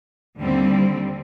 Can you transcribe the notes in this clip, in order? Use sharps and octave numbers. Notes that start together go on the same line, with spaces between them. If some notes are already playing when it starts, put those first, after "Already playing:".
D#2 D3 G3 C4